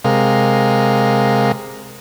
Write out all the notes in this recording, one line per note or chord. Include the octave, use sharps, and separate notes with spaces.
C3 G#3 A#4 F5